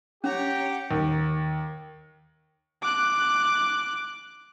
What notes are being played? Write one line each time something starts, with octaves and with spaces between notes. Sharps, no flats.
C#4 G4 C#5 F#5 A#5
D#2
D6 F#6